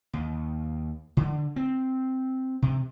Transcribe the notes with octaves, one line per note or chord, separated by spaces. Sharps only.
D#2
D3
C4
C3